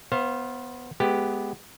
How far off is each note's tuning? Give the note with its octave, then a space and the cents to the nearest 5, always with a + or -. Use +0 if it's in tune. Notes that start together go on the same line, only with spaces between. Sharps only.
B3 +0 C5 +30 F5 -10
G#3 +15 B3 +0 G4 +0